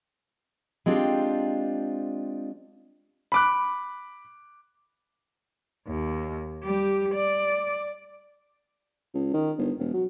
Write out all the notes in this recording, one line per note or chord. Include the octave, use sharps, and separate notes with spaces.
G#3 C4 D4 F4 G4
B5 D6 F#6
D#2
G3 G4
D5
C#2
D#3
G1
E1
F#3